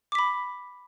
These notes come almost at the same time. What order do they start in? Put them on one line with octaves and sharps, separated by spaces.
D6 B6 B5